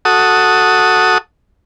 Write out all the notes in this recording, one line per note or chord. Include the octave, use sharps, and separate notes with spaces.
F#4 A4 D#6